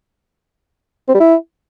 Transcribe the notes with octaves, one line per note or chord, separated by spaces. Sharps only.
C4
G3
E4